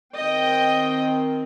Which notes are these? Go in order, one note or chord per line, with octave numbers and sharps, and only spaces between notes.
D#3 C4 D#5 G5